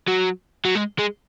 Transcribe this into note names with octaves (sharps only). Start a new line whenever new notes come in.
F#3
F#3
G#3
G#3